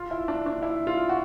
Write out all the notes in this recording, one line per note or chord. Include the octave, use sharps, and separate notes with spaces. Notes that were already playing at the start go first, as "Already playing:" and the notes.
Already playing: F4
E4
D4
D4
E4
F4
F#4